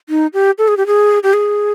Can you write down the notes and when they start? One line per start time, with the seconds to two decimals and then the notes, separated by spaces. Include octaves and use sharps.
0.09 D#4
0.34 G4
0.58 A4
0.68 G#4
0.77 G4
0.87 G#4
1.23 G4
1.33 G#4